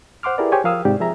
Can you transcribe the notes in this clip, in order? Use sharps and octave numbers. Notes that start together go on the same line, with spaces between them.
C5 F#5 C6 D6 F6
E4 G4 G#4 A#4 B4 D5
G4 G#4 C5 C#5 G5 G#5
F3 A#4 F5 D#6 E6
G#2 C3 G4 D5
F3 G#4 E5 A#5